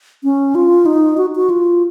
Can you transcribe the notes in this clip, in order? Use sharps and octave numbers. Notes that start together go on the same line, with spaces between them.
C#4
F4
D#4
F#4
F#4
F4